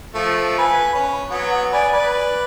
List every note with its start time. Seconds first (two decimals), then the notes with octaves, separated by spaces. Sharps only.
0.15 F3 A3
0.58 B4 G#5
0.95 C#4
1.31 F#3 B3
1.73 B4 D5 G#5
1.93 B4 D5